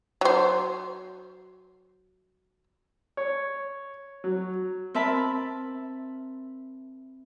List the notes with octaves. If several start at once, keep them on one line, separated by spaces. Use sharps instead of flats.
F#3 C5
C#5
F#3
C4 A#4 E5 A5 B5